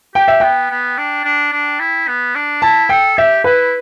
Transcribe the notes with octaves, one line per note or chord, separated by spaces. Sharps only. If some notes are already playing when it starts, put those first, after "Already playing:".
G4 G5
E5
B3 G5
B3
D4
D4
D4
E4
B3
D4
E4 A5
A4 G5
G4 E5
E4 B4